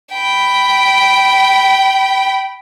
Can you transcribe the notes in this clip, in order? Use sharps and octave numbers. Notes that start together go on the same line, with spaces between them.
G5 B5